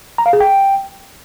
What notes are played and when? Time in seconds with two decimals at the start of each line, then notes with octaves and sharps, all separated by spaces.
0.18 A#5
0.26 F5
0.33 G#4
0.40 G5